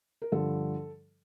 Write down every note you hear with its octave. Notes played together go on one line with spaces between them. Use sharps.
A#4
G2 D3 F3 A4